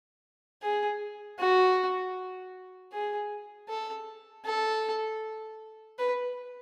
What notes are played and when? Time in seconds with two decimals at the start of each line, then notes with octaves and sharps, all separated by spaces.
0.62 G#4
1.39 F#4
2.92 G#4
3.69 A4
4.45 A4
5.99 B4